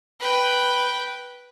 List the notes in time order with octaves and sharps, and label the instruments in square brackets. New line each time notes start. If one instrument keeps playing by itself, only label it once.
[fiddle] B4 G5